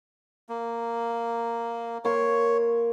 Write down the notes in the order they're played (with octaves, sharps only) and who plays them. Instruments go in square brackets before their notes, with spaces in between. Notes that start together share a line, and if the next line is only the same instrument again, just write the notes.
[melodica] A#3
[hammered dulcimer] A#3 C6 [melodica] C#5